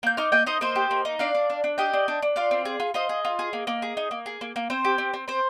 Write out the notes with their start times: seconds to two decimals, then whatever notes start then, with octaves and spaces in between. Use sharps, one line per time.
0.03 A#3 G6
0.17 D#4 D6 F6
0.32 A#3 D#5 G5
0.46 D#4 C5 D#5
0.61 A#3 C5 D#5
0.76 G4
0.91 A#3
1.05 D#4
1.19 D4 D5 F5
1.35 D4
1.50 D4
1.64 D4
1.78 G4 D#5 G5
1.93 D4
2.08 D4
2.22 D4
2.36 F4 D5 F5
2.51 C4
2.65 G#4
2.80 F4
2.94 F4 C5 D#5
3.09 G#4
3.25 F4
3.39 G#4
3.53 A#3
3.67 A#3
3.82 G#4
3.97 D#4
4.11 A#3
4.26 G#4
4.41 A#3
4.56 A#3
4.70 C4 C5
4.85 G4
4.98 C4
5.14 C4
5.28 C4 C5